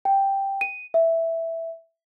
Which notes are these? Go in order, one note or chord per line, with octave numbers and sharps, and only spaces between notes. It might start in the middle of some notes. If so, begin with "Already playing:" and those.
G5
D#7
E5